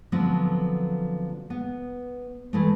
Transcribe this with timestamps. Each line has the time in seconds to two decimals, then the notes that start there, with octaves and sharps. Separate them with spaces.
0.12 D3 F3 F#3 A3 B3 C4
1.50 B3
2.53 E3 G#3 A3